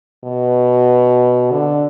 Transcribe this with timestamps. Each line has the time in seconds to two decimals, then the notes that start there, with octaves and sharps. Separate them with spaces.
0.24 B2
1.52 D3